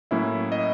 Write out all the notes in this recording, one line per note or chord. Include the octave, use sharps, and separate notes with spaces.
A2 F#3 A#3 C#4 E4 E5
D#5